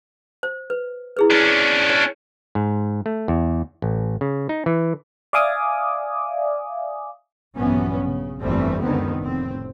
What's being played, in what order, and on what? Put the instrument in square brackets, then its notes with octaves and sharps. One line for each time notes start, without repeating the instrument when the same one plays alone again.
[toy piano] C5
B4
E4 G#4 B4
[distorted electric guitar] C#4 D4 [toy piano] D6
[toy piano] C#5
[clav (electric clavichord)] G#2
A3
E2
A1
C#3
D#4
E3
[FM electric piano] D5 E5 F5 G#5 D6 D#6
[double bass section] A#1 G2 E3 F#3 B3 C#4
C#3
G1 F2 E3 G3 A3 C4
C#2 F#2 D3 D#3 B3 C4
F1 A2 C4